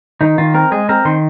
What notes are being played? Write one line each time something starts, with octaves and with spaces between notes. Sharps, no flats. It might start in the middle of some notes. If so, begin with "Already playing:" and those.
D#3 D#4
D#3 F4
C4 A#4
G#3 G#4
C4 A#4
D#3 C6